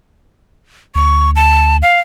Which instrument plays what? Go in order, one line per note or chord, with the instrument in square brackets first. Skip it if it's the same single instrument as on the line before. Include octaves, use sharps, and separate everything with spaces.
[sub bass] D2 [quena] C#6
[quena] A5
F5